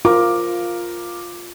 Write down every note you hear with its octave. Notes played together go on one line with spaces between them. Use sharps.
F4 A#4 D6